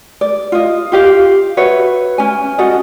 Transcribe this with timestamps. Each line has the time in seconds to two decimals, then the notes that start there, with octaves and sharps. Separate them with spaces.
0.21 D5
0.52 F4 D#5
0.92 F4 G4 F5
1.57 F#4 B4 C#5 E5
2.18 C#4 G#5
2.58 C#4 F#4 A4 D#5